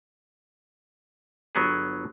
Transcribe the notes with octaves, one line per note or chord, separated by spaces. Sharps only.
G1 F#3 B3 G#4